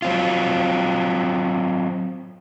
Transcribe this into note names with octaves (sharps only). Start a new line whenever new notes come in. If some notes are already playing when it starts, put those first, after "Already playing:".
F#3 C4 F4